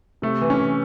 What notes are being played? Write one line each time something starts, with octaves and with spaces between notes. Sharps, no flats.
C3 A3
E3
C#4
E3